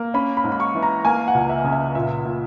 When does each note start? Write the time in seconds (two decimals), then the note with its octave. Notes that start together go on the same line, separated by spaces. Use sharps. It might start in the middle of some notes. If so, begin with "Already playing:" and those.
Already playing: A#3
0.14 C#4 B5
0.37 B5
0.44 G#2
0.52 B5
0.60 C#6
0.75 E3
0.83 A#5
1.05 A#3 G#5
1.28 F#5
1.34 C#2
1.49 E5
1.64 C#3
1.72 E5
1.95 A#2 E5
2.25 A#2